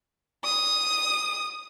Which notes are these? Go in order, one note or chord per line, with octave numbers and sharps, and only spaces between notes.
D#6